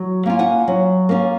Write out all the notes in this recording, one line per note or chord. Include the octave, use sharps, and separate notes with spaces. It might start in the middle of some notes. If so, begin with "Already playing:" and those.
Already playing: F#3
A#3 C#4 F4
F#5 G#5
F#3
A#3 C#4 F4